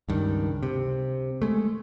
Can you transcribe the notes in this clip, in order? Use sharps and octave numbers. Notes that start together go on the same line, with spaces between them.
C#2 G2 D#3
C3
G#3 A3